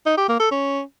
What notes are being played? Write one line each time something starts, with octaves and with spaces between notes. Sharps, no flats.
D#4
G4
A#3
A4
C#4